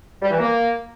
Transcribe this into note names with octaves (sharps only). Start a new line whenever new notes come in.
G3
E3
A#3